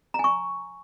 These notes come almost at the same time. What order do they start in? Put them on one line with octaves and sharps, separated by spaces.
A#5 G#5 C#6